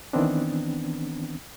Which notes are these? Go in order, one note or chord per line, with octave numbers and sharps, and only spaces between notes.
D#3 E3 B3 C4 D4